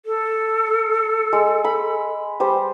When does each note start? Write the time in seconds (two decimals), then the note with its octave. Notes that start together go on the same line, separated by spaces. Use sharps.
0.06 A4
1.33 G#3
1.64 B5
2.40 G3 C5